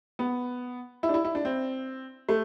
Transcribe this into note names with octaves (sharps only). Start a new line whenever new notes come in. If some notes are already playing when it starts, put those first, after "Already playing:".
B3
E4
D4
E4
E4
D4
C4
A3